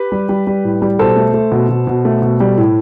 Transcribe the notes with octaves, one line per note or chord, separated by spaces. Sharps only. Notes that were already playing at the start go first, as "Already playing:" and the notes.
Already playing: G4 B4
G3
G3
G3
A2
G3
B2 A4 C5
A3
A3
B2
B2
B2
A3
B2
G3
A2